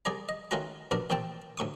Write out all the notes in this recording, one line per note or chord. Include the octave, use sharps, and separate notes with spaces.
C2 G#4 D5 A#5
D#5
D#3 A3 C#4 F4 F#4 A#5
A#1 B2 D4 A#4
A1 A#2 C4 G5 A5
D2 A2 C#6 D#6